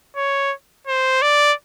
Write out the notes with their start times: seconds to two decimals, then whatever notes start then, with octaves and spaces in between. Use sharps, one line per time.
0.17 C#5
0.87 C5
1.22 D5